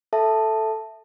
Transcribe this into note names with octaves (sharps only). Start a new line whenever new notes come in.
A4 E5 A5